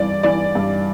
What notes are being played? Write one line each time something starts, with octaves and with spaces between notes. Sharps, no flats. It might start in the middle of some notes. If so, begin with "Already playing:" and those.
Already playing: G2 E3 D5
E3 D5
G2